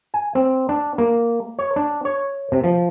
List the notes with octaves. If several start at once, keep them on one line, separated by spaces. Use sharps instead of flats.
G#5
C4
D4
A#3
C#5
D4
C#5
C3
F3